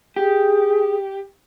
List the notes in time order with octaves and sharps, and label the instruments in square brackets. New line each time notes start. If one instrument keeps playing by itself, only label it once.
[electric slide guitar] G4 [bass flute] G#4